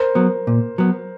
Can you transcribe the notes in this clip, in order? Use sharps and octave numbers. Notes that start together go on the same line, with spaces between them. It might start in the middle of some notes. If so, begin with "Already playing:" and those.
Already playing: A#4 C5
F#3 B3
A#2
F#3 B3